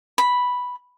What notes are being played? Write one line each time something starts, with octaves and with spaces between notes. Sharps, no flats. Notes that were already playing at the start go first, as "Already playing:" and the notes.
B5